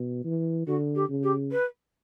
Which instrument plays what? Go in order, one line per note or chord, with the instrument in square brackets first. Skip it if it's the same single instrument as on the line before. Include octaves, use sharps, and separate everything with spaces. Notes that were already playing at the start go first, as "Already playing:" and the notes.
Already playing: [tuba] B2
E3
[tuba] D3 [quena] F#4
[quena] G4
[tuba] C#3
[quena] G4
B4